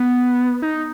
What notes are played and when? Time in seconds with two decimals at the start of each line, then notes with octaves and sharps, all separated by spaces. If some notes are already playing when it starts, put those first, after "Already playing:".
Already playing: B3
0.62 D#4